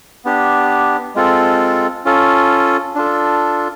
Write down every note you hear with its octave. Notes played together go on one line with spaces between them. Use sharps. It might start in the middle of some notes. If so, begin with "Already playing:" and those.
B3 D4 G4
G#3 C4 F4 A4
C#4 F4 A4
D4 F4 A4